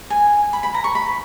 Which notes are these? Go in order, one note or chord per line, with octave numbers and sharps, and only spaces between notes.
G#5
B5
B5
A#5
C#6
B5